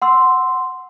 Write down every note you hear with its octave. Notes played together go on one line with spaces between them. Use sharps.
F#5 C6 E6